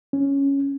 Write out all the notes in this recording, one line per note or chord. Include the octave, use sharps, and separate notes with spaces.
C#4